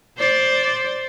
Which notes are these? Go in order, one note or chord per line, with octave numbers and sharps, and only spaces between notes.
C5 D5